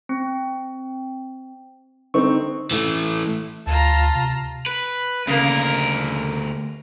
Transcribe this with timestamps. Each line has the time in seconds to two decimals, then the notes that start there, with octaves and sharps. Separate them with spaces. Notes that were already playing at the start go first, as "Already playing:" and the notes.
0.09 C4
2.14 D3 C4 D#4 C#6
2.71 E3 A3
3.67 D2 F4 A5 A#5
4.15 C3
4.67 B4
5.27 D2 C#3 A#3 A#4